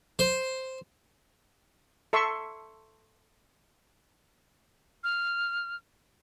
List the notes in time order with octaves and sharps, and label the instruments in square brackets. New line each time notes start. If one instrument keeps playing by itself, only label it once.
[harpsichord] C5
[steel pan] A4 E5 C6 C#6
[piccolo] F6